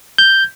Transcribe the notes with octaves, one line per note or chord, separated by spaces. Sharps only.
G6